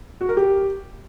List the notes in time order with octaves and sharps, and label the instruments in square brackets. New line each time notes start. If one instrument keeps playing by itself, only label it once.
[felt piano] F#4
A#4
G4